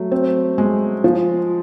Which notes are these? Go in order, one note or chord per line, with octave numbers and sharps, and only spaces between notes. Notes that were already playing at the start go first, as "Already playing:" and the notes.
Already playing: F#3 A3
C4
G#3
F3